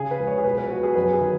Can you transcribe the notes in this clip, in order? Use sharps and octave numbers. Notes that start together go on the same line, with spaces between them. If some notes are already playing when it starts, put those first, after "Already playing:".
Already playing: C#3 G#4
B4
C#2
C#5
G#4
B1 B4
B4
B2 F#4
G#4
F#2 B4
G#4
D#3